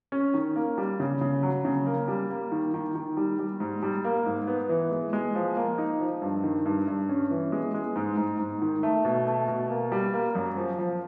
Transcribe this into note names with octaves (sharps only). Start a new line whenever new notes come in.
C#4
D#3
A#3
G3
C#3
C#3
F#3
C#3
A#3
G3
A#3
D#3
D#3
D#3
G3
G3
G#2
G3
A#3
G#2
B3
E3
G#3
G#3
F3
A#3
D#4
F3
G2
D#3
G2
G2
C#4
E3
G#3
G#3
G#2
G#2
G#2
D#3
A3
B2
A3
B2
A#3
G3
A#3
F#2
F3
F3